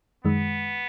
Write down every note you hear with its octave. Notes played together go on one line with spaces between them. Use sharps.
F#2 D#3 G#3 B3